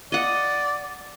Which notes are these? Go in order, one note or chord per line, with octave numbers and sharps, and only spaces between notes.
D5 D#5 F#5